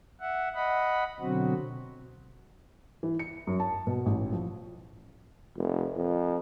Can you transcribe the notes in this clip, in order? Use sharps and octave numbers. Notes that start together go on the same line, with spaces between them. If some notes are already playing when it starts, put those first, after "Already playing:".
E5 F#5
D#5 F#5 B5
B2 D3 F#3 C4 F#4
E3
C#7
F#2
A5
B2
A1
F3
F1
F2